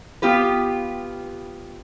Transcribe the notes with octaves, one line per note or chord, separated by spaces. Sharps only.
B3 F4 G4 B4